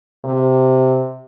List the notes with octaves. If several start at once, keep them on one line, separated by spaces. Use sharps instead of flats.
C3